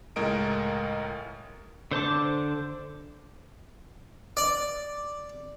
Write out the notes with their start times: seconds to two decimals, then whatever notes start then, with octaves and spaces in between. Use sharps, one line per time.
0.16 C#2 A2 G#3 A#4 D#5 D7
1.91 D3 C5 A5 D6
4.37 D5